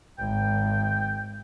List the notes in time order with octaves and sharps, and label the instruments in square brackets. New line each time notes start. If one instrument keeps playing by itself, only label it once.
[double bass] G#1 [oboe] G5